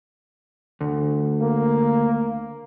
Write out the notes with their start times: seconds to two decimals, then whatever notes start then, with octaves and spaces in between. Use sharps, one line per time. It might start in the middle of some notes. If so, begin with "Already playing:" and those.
0.81 D2
1.41 A#3